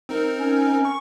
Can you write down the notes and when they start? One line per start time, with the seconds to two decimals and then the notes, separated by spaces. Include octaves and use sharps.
0.09 C4 D#4 A#4
0.39 C#4
0.85 C#6